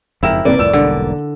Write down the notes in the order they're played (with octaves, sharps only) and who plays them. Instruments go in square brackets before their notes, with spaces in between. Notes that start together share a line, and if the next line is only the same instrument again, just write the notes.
[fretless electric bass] F#1 F2 G#2 [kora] E4 A#4 [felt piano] E5 G5 E7
[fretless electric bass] E1 G2 D#3 [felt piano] C3 B4 [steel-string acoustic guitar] A#3 D5
[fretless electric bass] C2 F2 A2 [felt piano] E6 E7
[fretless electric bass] E1 B1 G3 [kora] D3